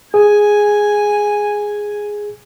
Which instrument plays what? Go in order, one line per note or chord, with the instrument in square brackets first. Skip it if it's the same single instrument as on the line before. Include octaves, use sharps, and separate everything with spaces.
[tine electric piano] G#4 [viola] G#5